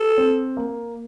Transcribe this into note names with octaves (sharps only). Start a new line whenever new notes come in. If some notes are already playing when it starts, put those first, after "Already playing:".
Already playing: A4
C4
A#3